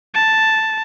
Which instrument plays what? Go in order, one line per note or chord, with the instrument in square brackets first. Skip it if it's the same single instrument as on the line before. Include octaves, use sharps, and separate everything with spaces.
[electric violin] A5